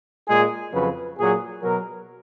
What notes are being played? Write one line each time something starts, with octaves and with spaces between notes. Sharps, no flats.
A#2 G#3 G#4
F2 C#3 F#3 B4
A#2 F#3 G#4
B2 F#3 A#4